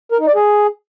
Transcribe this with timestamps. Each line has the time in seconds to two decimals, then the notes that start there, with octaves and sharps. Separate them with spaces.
0.12 A#4
0.19 D#4
0.27 D5
0.35 G#4